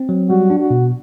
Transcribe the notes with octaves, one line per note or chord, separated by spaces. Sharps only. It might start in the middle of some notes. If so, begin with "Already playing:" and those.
Already playing: C4
F#3
G3 F#4
D4
F#4
B2